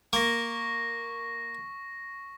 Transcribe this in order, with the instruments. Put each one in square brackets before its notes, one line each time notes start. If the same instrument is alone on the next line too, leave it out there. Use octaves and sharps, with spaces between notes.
[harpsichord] A#3 [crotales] C#6 A#6